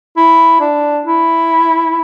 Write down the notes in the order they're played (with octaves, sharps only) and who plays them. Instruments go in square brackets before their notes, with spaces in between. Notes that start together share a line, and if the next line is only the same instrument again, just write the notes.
[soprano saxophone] E4
D4
E4